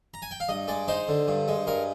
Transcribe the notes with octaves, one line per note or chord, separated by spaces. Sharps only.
A#5
G#5
G5
F5
G2 D#5
G#3 D5
D#4 C5
D3
G2
G#3
G2 A#4